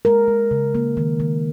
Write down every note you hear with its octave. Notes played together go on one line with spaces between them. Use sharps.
G#3 A#4
G#3
C#3
A#3
D#3
D#3